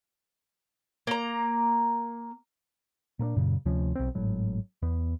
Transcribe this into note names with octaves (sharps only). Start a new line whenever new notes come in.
A#3 A#5
A#2 A#3 C4 D4
F#2 A#2 C#3
D2 C3 F3 C#4
B1 C4
G#1 A2 F#3
E2 B3